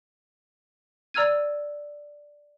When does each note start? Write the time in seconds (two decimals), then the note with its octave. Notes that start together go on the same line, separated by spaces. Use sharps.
1.14 D5 A#5 E6 F6 G#6 D#7